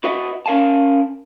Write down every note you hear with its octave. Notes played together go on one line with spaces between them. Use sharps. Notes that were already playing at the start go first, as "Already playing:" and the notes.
E4 F#4 B4 D#5 E5 F#5
C#4 A#4 F5 G#5 A5